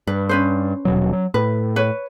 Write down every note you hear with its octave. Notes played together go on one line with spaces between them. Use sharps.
G2 B4
C#4 B4 C5
D#1 B2 F#3
F#3
A2 B4
B4 C#5